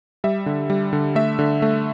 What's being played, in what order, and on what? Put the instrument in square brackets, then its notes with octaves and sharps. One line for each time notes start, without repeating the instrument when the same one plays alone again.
[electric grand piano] G3 E5
D3
G3
D3
A3 E5
D3
A3